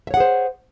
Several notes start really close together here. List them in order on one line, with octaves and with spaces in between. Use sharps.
E5 C#5 F#5 G#4 C5